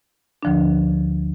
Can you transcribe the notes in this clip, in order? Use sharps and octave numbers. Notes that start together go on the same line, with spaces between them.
D2 D3 F3 D4